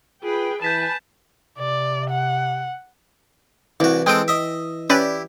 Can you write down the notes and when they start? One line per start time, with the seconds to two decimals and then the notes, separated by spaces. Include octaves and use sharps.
0.23 F4 G#4 B4 G5
0.62 E3 B4 G#5 A5 G6 B6 E7
1.59 C3 D5
2.10 F#5
3.80 C2 E3 F#4 D6
4.06 G#3 C4 A4 G5 D7
4.28 D#5 E5
4.90 C#4 E4 G4 B4 D5